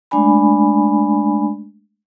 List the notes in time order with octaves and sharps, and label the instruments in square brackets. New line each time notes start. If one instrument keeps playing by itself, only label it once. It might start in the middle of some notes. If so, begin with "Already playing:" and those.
[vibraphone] G#3 A3 D4 D5 G#5 B5